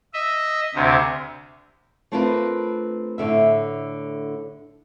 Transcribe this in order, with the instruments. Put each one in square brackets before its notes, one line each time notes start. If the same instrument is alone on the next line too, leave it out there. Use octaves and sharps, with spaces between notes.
[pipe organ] D#5 E5
D2 C3
[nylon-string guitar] A3 C4 D4 F4 A#4 B4
A2 D3 E5